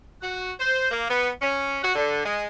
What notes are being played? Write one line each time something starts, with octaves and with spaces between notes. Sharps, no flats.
F#4
C5
A#3
B3
C#4
F#4
D3
G#3